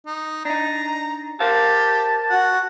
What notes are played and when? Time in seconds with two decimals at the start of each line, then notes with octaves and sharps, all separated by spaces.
0.06 D#4
0.45 D4 D#4 A#5
1.40 G4 A#4 C5 F5 A5
2.30 F#4 F#5